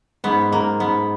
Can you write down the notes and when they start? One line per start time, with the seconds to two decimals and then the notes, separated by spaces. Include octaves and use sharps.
0.24 G#2 B3
0.51 G#2 A#3
0.80 G#2 B3